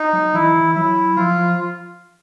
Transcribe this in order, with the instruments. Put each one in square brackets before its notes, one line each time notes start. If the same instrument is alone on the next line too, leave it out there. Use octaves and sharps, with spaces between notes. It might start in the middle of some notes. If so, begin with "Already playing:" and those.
Already playing: [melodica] D#4
[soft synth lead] F#3
[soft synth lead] E3 [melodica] E4
[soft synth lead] E3
[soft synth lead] F#3 [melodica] E4
[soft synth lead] F3 [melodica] F4